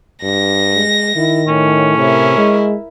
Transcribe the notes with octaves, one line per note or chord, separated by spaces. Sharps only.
G2 A#6
G#3
D#3 E4
A2 C#4
C3 E4 A#4
G#3